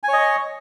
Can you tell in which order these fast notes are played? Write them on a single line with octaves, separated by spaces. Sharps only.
G#5 C#5 D#5 C#6